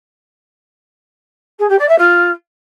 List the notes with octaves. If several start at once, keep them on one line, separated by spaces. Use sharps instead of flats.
G#4
G4
D5
E5
F4